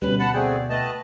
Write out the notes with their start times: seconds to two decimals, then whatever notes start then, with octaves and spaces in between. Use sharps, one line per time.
0.02 D2 B2 G3 C#4 B4
0.20 F#5 A5 B5
0.34 A3 C4 G#4 D5 F#5 G5
0.70 A3 B4 D#5 A5